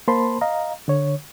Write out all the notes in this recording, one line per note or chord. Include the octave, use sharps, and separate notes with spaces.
A#3 A#4 C5 A5 B5 C6
D#5 F5 A#5
D3 C#5